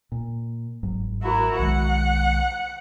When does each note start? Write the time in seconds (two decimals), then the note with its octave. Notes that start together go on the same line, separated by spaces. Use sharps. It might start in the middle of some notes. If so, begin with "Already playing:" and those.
0.12 A#2
0.83 G1 G#2 F#3
1.22 E4 F#4 A#4
1.59 B1 D#3 G#3 F#5